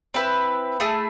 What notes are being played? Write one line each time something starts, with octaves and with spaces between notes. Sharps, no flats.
C4 E4 B4
A3 E4 G#4